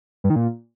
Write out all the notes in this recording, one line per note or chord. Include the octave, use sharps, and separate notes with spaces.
G2
D#3
A#2